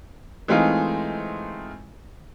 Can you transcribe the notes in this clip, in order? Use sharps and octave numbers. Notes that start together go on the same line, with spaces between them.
E3 G#3 A3 C4 D#4 F4